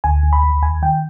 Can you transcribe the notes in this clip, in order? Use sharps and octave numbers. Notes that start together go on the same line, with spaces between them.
D2 G#5
D2
B5
D2
D#2 G#5
D#3 G5